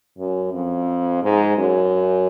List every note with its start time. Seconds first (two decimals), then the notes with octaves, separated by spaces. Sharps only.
0.18 F#2
0.54 F2
1.23 G#2
1.58 F#2